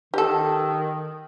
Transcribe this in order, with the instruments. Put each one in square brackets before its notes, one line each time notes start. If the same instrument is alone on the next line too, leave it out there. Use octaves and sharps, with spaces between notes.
[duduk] D#3 [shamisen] G4 A4